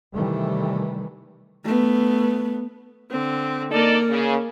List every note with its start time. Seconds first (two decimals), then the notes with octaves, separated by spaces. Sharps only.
0.15 C3 D#3 E3 G3 A3
1.65 A3 B3
3.11 D3 C4
3.72 A#3 D#4 A4 D5
4.10 C#3